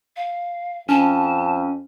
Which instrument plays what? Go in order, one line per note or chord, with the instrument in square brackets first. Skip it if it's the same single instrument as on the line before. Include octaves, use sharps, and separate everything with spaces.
[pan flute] F5
[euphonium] F2 [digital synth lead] C#4 [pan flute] A5